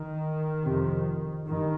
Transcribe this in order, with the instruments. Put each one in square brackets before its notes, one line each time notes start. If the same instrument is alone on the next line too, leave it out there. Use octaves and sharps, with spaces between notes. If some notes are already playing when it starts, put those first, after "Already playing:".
Already playing: [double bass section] D#3
F2 C3
G2 D#3